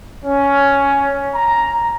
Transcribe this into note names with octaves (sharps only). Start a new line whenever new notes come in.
C#4
A#5